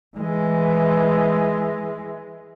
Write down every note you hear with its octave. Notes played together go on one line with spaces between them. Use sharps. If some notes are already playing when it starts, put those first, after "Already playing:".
E3 G#3